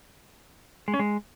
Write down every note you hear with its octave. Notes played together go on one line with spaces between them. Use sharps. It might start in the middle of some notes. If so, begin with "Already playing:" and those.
G#3
C#4
G#3